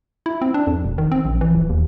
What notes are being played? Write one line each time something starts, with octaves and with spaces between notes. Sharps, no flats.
E4
C4
D4
F2
E1
D#3
C4
A#1
E3
D1
D#2